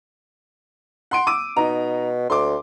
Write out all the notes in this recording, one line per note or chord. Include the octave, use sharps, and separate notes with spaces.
F#5 C6 D7
D6 E6 D#7
B2 D#4 A#5
D2 C6 D6